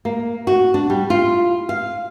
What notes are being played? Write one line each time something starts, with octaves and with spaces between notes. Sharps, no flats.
A#3
F#4
D4
G3
F4
F5